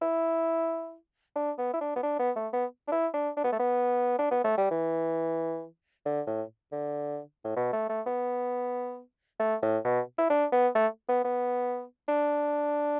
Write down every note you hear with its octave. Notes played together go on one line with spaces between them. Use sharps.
E4
D4
B3
E4
D4
B3
D4
B3
A3
B3
D4
E4
D4
D4
B3
A3
B3
D4
B3
A3
G3
E3
D3
A2
D3
A2
B2
A3
A3
B3
A3
A2
B2
E4
D4
B3
A3
B3
B3
D4